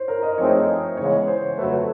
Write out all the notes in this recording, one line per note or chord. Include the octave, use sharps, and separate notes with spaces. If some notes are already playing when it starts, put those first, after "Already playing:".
Already playing: C5 C#5
A#4
D#5
F3 A3 C4 D#4 G#4 C#5
C#3 E3 G#3 B3 C#5
C5
F2 C#3 F#3 A3 B4